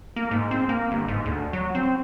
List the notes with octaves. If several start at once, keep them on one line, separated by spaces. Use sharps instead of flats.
A#3
G#2
C4
A#3
G1
G#2
D2
F#3
C4